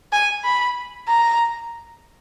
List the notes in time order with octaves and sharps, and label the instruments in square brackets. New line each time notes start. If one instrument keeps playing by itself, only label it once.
[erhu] G#5
B5
A#5